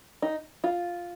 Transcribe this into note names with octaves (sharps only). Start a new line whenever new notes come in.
D#4
F4